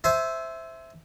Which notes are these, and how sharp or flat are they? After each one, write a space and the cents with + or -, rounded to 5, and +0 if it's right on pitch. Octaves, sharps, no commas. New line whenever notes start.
C5 +0 E5 +0 G#5 +35